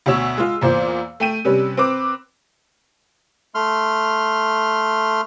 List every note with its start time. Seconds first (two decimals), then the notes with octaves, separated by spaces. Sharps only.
0.06 D2 B2 C#5 E6
0.38 G#3 F4
0.61 E2 A#2 C5
1.20 A3 G5 D#7
1.45 C3 G3 C#4 B4
1.77 C4 B4 D6
3.55 A3 C6 F6